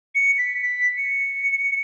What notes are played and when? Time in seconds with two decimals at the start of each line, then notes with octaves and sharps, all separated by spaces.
0.15 C#7
0.38 B6
0.62 B6
0.97 C#7